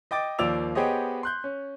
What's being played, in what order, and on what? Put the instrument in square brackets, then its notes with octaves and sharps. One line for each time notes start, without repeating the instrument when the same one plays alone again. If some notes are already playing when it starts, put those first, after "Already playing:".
[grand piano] D#5 G5 D6 A6
D#2 F3 A#3 D5 E6 F7
B3 G4 G#4 C5 C#5 D#5
C6 F#6 G6
C#4